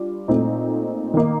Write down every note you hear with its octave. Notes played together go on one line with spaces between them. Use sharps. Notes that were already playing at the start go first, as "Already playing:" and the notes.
Already playing: G3 D4 F4
A#2 A3 C4 D#4
D#3 A#3 D#4